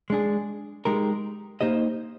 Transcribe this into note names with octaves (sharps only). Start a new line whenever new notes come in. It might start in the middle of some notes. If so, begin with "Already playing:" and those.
G#3 D4 G#4
G#3 D#4 G4 A#4
A#3 D#4 G4 C5 D#5